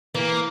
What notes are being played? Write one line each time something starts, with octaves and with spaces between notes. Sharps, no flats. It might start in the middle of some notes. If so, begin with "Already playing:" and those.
E3 A#3